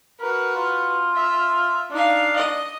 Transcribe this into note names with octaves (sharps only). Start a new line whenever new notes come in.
F#4 A#4 B4
F4
E5
D4 D#4 F5
D#5